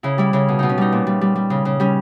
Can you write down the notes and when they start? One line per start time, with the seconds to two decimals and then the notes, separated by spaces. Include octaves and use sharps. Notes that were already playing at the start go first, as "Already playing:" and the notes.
0.03 C#3 E4
0.18 G3 E4
0.33 C#3 E4
0.49 B2
0.59 B2 D#4
0.69 C#4
0.78 G3 D#4
0.92 A#2
1.07 G3
1.21 G3
1.36 G3
1.50 C#3
1.65 C#3
1.80 G3 C#4